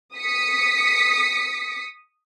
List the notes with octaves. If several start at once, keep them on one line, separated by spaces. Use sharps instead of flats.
D#6 B6 C#7